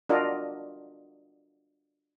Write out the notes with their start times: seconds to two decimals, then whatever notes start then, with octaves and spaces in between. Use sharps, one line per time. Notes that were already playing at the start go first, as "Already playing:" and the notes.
0.09 D4 F4 F#4 A#4 D5 D#5